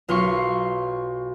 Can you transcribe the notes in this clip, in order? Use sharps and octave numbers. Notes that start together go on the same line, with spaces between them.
B1 F4 C6 C#6